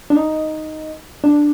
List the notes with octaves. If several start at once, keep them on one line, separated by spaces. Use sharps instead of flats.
D4
D#4
D4